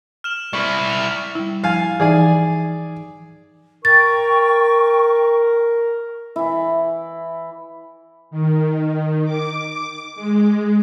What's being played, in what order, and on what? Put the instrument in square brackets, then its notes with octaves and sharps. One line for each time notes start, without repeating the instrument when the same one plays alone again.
[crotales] F6 E7 F#7
[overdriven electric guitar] G3 E4 [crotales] C#6 D#7
[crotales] F7
[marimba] G3 E4
[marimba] F3 F6 A6 [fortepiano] F5 G#5
[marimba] E3 D#4 [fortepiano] G#4 D5 G#5
[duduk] A#4 [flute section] G5 C#6 [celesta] A6
[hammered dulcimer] E3 E4
[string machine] D#3
D6
G#3